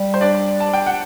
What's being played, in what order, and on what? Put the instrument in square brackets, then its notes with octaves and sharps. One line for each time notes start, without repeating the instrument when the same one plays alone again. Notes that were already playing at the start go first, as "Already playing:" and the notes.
Already playing: [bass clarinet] G3
[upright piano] C5
D4 D5
A5
G5
F#5